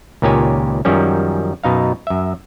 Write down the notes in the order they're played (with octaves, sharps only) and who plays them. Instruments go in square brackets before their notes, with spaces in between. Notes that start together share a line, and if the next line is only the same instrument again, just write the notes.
[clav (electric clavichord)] C#2 A#2 D#3 G4 C#5 G#5
F#2 D#3 F3 G3 C#4
F#2 B2 D#4 F5
F#2 E5